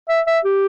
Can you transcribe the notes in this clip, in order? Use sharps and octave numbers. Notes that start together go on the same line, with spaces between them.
E5
E5
G4